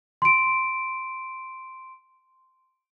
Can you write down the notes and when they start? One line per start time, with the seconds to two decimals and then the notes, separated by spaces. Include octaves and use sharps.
0.22 C6 D7